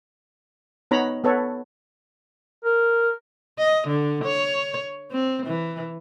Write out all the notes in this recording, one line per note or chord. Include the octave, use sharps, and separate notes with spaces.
B3 D#4 C#5 A#5 B5
B3 A4 B4 C#5
A#4
D#5
D3
C#5
C4
E3